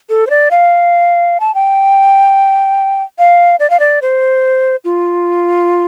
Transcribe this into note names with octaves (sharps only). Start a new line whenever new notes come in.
A4
C5
D5
F5
A5
G5
F5
D5
F5
D5
C5
F4